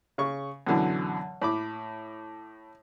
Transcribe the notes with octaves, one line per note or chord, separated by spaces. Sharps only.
C#3 C#6
F#2 B2 D3 E3
A2 B5 D6